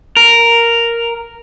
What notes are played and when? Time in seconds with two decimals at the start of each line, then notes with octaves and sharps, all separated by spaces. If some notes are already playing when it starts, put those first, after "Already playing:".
0.17 A#4